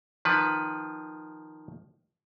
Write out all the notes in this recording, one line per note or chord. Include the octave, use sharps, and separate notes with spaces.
D#3 F3 B4